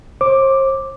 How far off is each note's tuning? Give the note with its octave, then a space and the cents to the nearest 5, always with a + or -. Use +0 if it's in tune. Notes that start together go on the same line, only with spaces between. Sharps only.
C5 +40 D6 +0